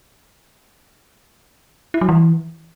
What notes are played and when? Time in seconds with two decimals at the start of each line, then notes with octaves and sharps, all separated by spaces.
1.94 E4
2.01 F#3
2.09 E3